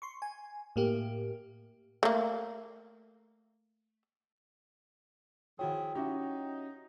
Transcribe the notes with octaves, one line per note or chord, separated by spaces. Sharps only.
C6 C#6
G#5
A2 A#3 G4
A3 A#3
D#3 F3 E4 F#4 G#4 C#5 G5
C#4 D#4 E4 F#4 G4 E5